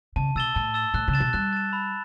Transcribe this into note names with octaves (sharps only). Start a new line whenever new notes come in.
C#3 A5
B2 E6 A6 E7 G7
A2 A5
E6 A6 E7 G7
A2 F#6
C#3
A6 E7
B2
G3 F#6
A6 E7
B5